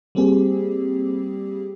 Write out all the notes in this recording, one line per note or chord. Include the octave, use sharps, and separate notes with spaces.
G3 A#3 C4 G4 G#4